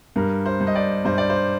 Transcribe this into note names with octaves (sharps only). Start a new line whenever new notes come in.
G2 A#4
C5
G2
D#5
D5
G2 C5
D5
C5